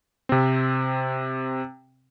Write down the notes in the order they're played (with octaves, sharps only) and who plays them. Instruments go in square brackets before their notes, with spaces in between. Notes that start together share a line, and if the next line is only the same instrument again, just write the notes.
[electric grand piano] C3 C4